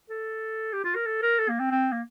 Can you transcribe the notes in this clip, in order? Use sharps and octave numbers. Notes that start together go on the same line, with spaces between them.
A4
G4
F4
A#4
A4
A#4
A4
A#3
C4
C4
A#3